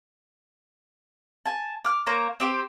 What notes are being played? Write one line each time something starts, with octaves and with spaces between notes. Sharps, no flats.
G#5 A5
D6 F6
A#3 C5 C#5 A#5
C4 G4 C5